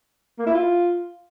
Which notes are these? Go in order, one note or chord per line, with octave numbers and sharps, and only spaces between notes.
A#3
E4
F4